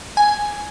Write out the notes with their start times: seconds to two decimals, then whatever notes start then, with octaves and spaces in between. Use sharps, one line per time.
0.17 G#5